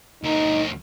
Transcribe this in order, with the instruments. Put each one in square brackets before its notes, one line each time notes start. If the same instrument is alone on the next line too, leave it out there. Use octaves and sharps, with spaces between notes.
[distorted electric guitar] D2 A#4 [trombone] D#4